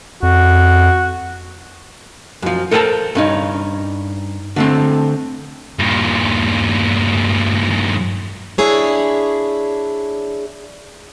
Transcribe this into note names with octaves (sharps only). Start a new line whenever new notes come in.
F2 F#4
F#2 F3
A4 A#4 C5 G#5 A5
G2 C#4 D#4
D3 A3 C4
G2 A#2
D4 E4 G#4 C#5